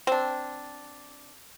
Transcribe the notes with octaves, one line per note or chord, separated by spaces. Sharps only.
C4 D4